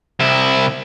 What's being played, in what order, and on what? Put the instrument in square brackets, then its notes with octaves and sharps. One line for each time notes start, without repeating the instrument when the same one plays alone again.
[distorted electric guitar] C2 E4